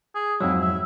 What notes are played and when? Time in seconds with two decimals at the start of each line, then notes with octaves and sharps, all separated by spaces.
0.15 G#4
0.40 F2 G#2 F#3 E4
0.61 E5